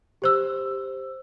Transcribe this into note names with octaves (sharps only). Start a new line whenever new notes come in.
G4 C5 E6